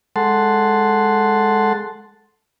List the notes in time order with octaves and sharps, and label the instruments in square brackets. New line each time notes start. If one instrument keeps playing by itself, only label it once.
[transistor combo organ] G#3 A4 F#5 A5 C6